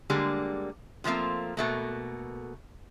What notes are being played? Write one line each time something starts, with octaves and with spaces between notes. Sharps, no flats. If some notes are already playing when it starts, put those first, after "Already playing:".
D3 G3 G#3 A#3
C3 F3 A3 A#3 C4
B2 A3 A#3